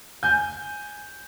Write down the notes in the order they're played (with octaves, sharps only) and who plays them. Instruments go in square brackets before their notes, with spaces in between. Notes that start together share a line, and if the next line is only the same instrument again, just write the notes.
[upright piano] G#5 G6